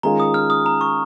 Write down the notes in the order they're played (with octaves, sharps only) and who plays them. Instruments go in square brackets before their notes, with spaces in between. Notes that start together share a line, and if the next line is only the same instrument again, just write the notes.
[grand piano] D#3 G#3 C#4 F4 G#4 [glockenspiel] A#5
[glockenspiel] D#6
F6
D#6
A#5
C#6